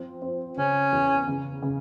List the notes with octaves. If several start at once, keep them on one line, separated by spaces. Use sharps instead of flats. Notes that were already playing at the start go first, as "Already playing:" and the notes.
Already playing: F3 C4
C4
C#3 C#4
E2
C#3
C#3